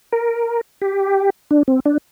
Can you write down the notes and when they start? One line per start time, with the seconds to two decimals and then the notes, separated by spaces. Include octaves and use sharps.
0.13 A#4
0.82 G4
1.51 D4
1.68 C4
1.85 D4